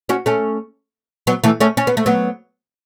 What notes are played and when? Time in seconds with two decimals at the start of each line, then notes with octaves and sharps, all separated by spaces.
0.09 C#4 F#4
0.26 A3 C#4
1.27 F#3 B3
1.44 E3 A3
1.61 A3 C#4
1.77 C#4
1.87 B3
1.97 A3
2.06 F#3 B3